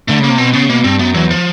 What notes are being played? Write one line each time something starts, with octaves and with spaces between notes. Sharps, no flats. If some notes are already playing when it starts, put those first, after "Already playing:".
D3 A3
C#3
A#3
C3
B2 C4
C#3 B3
B2 A#3
G2 C4
F#2 B3
E2 F#3
F3